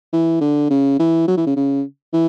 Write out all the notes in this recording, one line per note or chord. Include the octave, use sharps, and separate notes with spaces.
E3
D3
C#3
E3
F#3
E3
C#3
C#3
E3